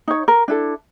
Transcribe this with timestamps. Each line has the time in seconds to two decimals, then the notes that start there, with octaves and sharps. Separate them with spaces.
0.08 D#4 C#5
0.28 A#4
0.48 D4 E4 A4